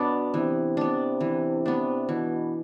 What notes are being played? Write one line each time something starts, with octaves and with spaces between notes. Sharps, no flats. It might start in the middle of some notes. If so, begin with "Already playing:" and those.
Already playing: B2 B3 D4
C3 E3
B3 D4
E3
B3 D4
B2 E3